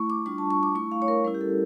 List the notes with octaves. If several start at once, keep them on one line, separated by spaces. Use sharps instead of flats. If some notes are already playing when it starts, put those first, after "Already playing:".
Already playing: A3 E4 C#6
D6
G3 D4 F4 C#6
A5
C#6
D6
A3 E4 C#6
F5
C#5
A#4
G3 C#4 E4 A#4
G4
A4